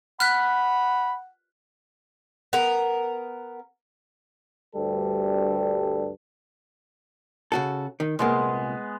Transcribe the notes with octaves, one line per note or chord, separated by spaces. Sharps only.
F#5 B5 F6 F#6 B6
B3 A#4
D2 G2 G3 A4
C#3 F#4 A4
D#3
C2 A#2 G#3 A#3 B3 G#4